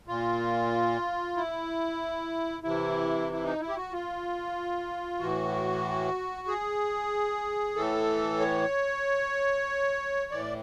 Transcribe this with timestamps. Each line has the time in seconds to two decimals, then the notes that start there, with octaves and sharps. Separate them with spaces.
0.08 A#2 F4
1.37 E4
2.63 C3 E3 E4
3.32 E4
3.44 D#4
3.60 E4
3.69 G4
3.76 F#4
3.92 F4
5.20 A2 E3 F#4
6.48 G#4
7.76 A2 E3 A4
8.40 C#5
10.31 A2 E3 D5